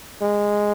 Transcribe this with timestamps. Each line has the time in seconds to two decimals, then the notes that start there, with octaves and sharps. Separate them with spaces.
0.22 G#3